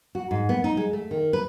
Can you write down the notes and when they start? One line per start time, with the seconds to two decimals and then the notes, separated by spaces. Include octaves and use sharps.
0.15 F#4
0.31 G#2
0.49 B3
0.64 D#4
0.77 G#3
0.93 A3
1.11 D#3
1.33 B4